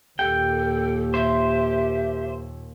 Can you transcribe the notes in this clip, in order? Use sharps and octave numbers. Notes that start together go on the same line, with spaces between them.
D#2 A#2 G4 A4 G5
C5 E5